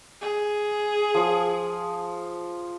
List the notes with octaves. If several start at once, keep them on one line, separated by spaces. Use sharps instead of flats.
G#4
F3 D#6